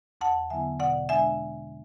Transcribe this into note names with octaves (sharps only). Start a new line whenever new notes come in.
E2 F#5 A5
D3 F#3 B3 E4 E5 G#5
B2 D5 F#5
G#3 D4 E5 G#5